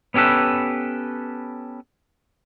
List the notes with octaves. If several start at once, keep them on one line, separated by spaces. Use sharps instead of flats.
B3 C#4 G4 A4 B4